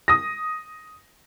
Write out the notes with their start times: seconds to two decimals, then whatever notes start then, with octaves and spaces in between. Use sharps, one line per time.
0.08 D#6 A#6